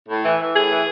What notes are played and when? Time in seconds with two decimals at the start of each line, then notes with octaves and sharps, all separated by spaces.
0.09 A2
0.24 E3
0.40 E3
0.55 A2 G#4
0.70 E3